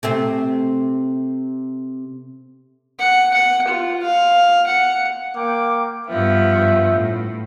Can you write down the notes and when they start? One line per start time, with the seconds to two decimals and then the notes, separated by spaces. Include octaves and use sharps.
0.03 C3 A3 C4
2.99 F#5
3.33 F#5
3.67 F4
4.02 F5
4.67 F#5
5.36 A#3 G5 D6
6.08 G2 F3 B3 E5
6.94 A2